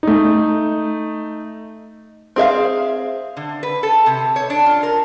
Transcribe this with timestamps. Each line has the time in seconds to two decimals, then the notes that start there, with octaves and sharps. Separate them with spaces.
0.03 A3 D#4
2.36 C4 G#4 E5 F5
3.37 D3
3.63 B4
3.83 A4
4.06 C3
4.36 C#5
4.50 D4
4.66 F4
4.83 A#4